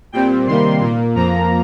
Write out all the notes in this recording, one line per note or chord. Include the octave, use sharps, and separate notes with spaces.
A#2 G3 C4 G5
C3 D#3 G3 A#3 C6
A#2 A#3
F2 F3 A#3 A#5